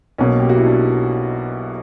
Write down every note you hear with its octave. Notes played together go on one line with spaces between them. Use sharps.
B1 B2 A#3 C#4
G4
F#4
E4
D4